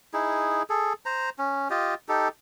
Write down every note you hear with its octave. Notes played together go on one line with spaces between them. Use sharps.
D#4 E4 G#4
G#4 A4
C5 A#5
C#4
F4 G4 D#5
D#4 G4 A4